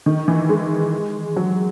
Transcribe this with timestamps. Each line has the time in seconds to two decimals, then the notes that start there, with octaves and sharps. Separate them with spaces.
0.06 D#3
0.28 E3
0.49 G#3
1.36 F#3